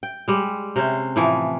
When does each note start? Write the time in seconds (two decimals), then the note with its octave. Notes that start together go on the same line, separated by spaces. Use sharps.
0.03 G5
0.28 G3 G#3
0.76 C3 C#4 C5
1.16 A2 E3 F3